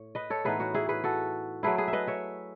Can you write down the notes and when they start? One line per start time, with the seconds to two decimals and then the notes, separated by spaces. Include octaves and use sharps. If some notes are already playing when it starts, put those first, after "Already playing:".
Already playing: A2 C#5
0.15 B4 D#5
0.30 A4 C#5
0.45 A2 E3 B3 D#4 G#4 B4
0.60 F#4
0.74 E4 G#4
0.89 G#4 B4
1.04 F#4 A4
1.63 F#3 A3 E4 G#4 B4
1.78 G#4 B4
1.88 E5
1.93 B4 D#5
2.07 C#5 E5